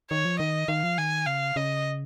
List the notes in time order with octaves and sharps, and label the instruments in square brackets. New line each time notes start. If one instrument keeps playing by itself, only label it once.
[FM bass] D#3 [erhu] C#5
[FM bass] F3
[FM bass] D#3 [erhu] D#5
[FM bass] D#3 [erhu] F5
[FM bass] F3
[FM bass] D#3 [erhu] G#5
[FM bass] C#3 [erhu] F5
[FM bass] C#3 [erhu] D#5